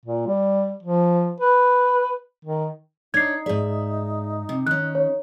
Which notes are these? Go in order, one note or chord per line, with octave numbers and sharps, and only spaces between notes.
A#2
G3
F3
B4
D#3
D4 D#4 C#5 G#6 C7
G#2 G#4 D5 E5
C3
D#3 C#4 F#6
C#5